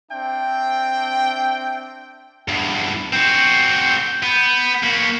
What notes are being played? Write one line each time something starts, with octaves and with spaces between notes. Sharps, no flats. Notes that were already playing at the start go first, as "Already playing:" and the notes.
C4 D4 E5 G5
E2 G2
C4 F#4 G6
B3
A#3 F#4 B6